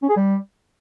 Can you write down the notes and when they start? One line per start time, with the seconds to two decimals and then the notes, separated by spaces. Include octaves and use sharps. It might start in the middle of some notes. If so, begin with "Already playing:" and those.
0.02 C#4
0.09 G#4
0.16 G3